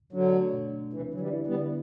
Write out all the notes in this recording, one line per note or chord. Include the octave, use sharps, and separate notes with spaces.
D3 F#3 D4
A3
B2
D4
C3 E3 E4
D3 F#3
E3 G3
E4
G3 B3
D3